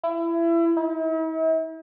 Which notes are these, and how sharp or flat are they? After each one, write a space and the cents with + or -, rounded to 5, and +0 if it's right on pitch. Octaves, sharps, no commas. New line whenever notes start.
E4 +25
E4 -45